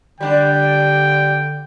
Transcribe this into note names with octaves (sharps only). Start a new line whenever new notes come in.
D3 G3 D4 G5